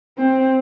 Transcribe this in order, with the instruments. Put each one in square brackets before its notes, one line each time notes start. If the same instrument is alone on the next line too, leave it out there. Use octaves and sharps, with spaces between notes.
[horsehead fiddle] C4